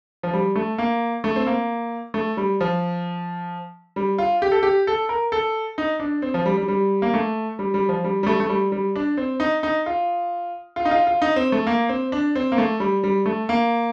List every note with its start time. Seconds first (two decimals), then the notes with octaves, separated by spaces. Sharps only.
0.23 F3
0.33 G3
0.56 A3
0.78 A#3
1.24 A3
1.36 C4
1.47 A#3
2.14 A3
2.37 G3
2.60 F3
3.96 G3
4.18 F4
4.42 G4
4.52 A4
4.63 G4
4.87 A4
5.09 A#4
5.32 A4
5.78 D#4
6.00 D4
6.22 C4
6.34 F3
6.46 G3
6.57 G3
6.68 G3
7.02 A#3
7.14 A3
7.59 G3
7.74 G3
7.89 F3
8.04 G3
8.23 G3
8.27 A3
8.40 A3
8.49 G3
8.72 G3
8.96 D4
9.17 C4
9.40 D#4
9.63 D#4
9.86 F4
10.76 F4
10.85 D#4
10.91 F4
11.07 F4
11.22 D#4
11.36 C4
11.52 A3
11.67 A#3
11.89 C4
12.12 D4
12.35 C4
12.52 A#3
12.58 A3
12.80 G3
13.04 G3
13.26 A3
13.49 A#3